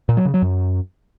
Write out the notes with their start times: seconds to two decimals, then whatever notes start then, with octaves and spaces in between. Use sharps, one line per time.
0.09 A#2
0.17 F#3
0.25 C#3
0.34 F#3
0.42 F#2